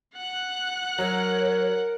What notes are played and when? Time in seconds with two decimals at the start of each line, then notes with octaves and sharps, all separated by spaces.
0.16 F#5 F#6
0.98 F#3 A#4 C#5